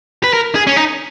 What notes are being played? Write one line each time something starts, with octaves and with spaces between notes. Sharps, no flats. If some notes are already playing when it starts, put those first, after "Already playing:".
B4
A#4
G#4
C#4
D#4